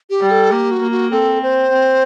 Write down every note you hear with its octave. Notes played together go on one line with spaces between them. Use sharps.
G4
G3
A4
A#3 G4
F#4
A#3
F#4
C4 A4
C5
C4